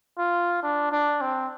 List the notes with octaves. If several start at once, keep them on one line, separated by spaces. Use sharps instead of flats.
F4
D4
D4
C4